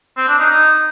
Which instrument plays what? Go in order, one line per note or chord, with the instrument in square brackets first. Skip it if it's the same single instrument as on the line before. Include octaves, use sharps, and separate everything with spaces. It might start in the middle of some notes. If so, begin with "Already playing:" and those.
[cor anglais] C4
D4
D#4
D#4